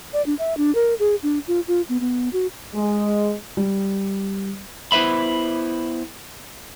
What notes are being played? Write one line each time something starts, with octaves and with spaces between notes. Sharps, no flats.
D5
D4
E5
D4
A#4
G#4
D4
F4
F4
B3
B3
F#4
G#3
G3
B3 E4 B4 C5 E5 B5